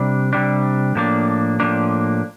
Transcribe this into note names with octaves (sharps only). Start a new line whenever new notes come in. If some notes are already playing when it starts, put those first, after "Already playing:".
Already playing: C3 G3 D4
C3 G3 D4
A2 F3 A#3 D4
A2 F3 A#3 D4